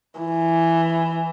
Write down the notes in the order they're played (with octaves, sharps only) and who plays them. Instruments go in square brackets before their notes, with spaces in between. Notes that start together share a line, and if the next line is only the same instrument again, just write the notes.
[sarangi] E3